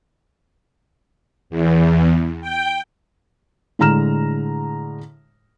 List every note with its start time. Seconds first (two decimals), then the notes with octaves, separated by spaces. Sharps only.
1.50 E2
2.41 G5
3.79 A2 D3 G#3 A#5 F6 E7